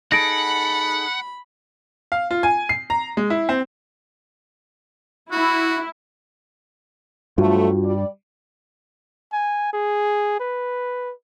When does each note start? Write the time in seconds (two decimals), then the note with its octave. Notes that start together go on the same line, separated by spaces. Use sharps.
0.12 D#4 G#4 A4 F#5 B5 A#6 D7
2.12 F5
2.31 F4
2.43 G#5
2.69 C7
2.90 A#5
3.17 G#3
3.30 E4
3.49 C4
5.31 E4 F#4
7.38 G2 F3 F#3 A3 F4 F#4
7.84 G3 D5
9.33 G#5
9.73 G#4
10.40 B4